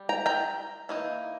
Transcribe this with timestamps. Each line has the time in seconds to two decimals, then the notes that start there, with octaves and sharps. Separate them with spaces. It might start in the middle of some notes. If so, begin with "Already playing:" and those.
Already playing: G3
0.09 G5 A#5
0.26 G5 A#5
0.89 E3 A#3 D#4